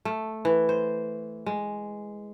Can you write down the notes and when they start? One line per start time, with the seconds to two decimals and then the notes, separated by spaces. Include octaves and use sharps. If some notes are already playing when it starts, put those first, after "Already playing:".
0.05 A3
0.45 E3
0.69 C5
1.46 G#3